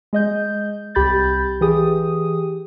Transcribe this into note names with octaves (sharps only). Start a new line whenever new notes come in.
G#3 D#5 G6
C2 G4 B5 G6 A6
E3 G4 G#4 D#6